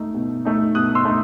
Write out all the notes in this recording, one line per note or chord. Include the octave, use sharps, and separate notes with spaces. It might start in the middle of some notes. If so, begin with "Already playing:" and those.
Already playing: A3 D#4
B2
A3 D#4
B2 D#6 F#6
C6 E6
A3 D#4